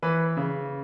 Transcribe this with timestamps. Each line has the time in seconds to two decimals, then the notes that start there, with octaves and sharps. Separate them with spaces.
0.03 E3 B4
0.37 C#3